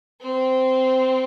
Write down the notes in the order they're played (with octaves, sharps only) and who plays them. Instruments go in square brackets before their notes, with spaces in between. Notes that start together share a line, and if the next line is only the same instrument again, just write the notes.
[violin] C4